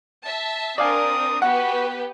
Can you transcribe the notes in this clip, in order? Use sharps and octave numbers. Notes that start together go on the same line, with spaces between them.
E5 A5
C4 D4 A#4 D5 F5 G#5 D#6
B3 F#4 G4 B4 F#5